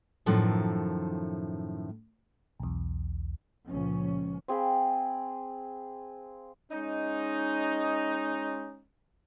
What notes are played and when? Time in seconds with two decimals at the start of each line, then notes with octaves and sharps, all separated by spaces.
0.26 F#2 A2 D#3 F3 A3
2.60 B1 E2
3.67 C#2 A#2 F3 C#4
4.48 C4 G#4 F5 B5
6.72 G#3 C#4 D#4